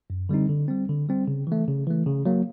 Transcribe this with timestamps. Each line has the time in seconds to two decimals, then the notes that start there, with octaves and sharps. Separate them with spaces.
0.10 F#2
0.29 D3 G3 C4 D#4
0.49 D3
0.68 G3 C4
0.89 D3
1.09 G3 C4
1.27 C#3
1.47 E3 A3
1.68 C#3
1.87 E3 A3
2.06 C#3
2.26 F#3 A#3